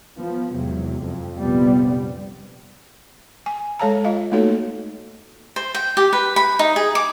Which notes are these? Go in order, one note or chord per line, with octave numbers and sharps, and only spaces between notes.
F3 B3
E2 G#2 C3 F#3
F2
A#1 F2 C3 F3 G3 B3
G#5
G#3 A4 C#5 F5 A5 A#5
F4 D#5 F5
A3 A#3 D#4 F#4 A4 C#5
C5
G5
G4
B4
B5
D#4
G#4
D6